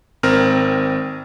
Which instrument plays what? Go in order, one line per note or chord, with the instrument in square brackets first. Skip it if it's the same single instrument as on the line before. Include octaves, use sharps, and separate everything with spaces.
[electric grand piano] G#1 C4 A#4 F6